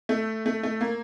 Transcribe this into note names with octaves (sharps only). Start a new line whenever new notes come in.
A3
A3
A3
A#3